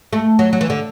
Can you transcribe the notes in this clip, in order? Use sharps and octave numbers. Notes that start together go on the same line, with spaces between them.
A3
F#3
F#3
E3
D3